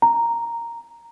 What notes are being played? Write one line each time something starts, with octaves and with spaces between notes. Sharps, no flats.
A#5